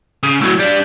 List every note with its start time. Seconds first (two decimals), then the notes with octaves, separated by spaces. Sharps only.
0.23 C#3
0.41 A2 F#3
0.59 G3 D4